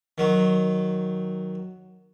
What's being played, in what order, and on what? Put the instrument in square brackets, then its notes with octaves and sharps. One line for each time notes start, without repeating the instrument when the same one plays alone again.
[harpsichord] D#3 F#3